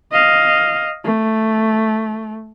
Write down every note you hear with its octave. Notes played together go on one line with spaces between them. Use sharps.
D#5 F5
A3